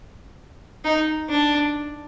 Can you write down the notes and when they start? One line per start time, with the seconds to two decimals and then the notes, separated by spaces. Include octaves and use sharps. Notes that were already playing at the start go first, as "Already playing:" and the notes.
0.85 D#4
1.30 D4